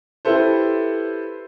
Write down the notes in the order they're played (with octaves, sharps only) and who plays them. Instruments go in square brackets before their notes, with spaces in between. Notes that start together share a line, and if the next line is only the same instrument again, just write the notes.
[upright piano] E4 G4 A4 B4 C5